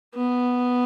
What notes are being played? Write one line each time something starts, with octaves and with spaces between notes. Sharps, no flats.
B3